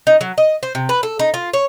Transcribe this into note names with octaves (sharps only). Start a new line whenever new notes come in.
D#4
F#3
D#5
C5
C3
B4
A4
D#4
F4
C#5